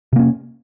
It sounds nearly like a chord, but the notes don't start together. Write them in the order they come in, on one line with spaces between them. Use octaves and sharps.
C3 A#3 C#4